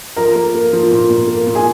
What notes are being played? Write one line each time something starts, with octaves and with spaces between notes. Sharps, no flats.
F3 A#4 A#5
A#3
A#3
F3
A#2
A#2
A#3
A#2
G#4 G#5